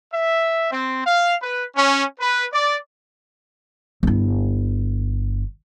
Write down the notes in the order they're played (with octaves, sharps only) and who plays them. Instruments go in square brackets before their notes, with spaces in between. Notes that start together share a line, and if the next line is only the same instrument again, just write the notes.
[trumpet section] E5
C4
F5
B4
C#4
B4
D5
[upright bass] G1 E4